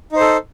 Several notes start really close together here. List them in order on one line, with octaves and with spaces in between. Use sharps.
D#4 C5 A4